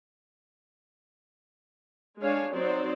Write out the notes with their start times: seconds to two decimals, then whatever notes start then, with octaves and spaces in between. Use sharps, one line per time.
2.21 G#3 D4 C#5 F5 G#5
2.54 F#3 C4 D#4 C5 D5